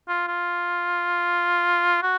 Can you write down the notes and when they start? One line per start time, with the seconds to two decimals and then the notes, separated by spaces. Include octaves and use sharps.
0.08 F4
0.27 F4
2.02 F#4